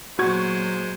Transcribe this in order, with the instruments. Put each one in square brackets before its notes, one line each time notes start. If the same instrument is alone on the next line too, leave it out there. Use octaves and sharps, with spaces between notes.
[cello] A#2 F#3 [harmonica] G#3 C5 [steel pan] F#4 [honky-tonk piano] C#6 G#6